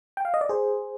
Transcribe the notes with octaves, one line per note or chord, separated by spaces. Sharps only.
G5
F5
D#5
D5
G#4 C5